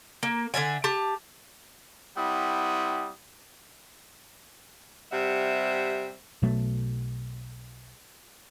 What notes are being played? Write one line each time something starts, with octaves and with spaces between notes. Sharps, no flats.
A#3
D3 C#5 E5 G#5
G4 A5
G3 C4 E4 F#5 D#6
C3 G3 E5 F#5
B1 B2 F#3 A3